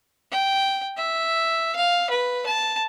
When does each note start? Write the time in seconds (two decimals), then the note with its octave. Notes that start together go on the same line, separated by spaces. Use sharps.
0.31 G5
0.97 E5
1.76 F5
2.10 B4
2.47 A5